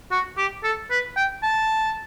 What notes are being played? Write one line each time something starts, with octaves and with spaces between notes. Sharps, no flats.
F#4
G4
A4
B4
G5
A5